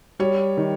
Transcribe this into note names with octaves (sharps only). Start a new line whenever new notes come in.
G3 C#5
D#3